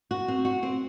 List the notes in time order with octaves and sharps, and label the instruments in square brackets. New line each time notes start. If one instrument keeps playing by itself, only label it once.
[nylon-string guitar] F#4
C4
F#4
C4